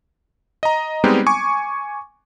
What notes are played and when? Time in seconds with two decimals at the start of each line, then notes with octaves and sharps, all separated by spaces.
0.63 D#5 A#5
1.04 G3 G#3 B3 C4 D#4 G4
1.26 G#5 C#6 D6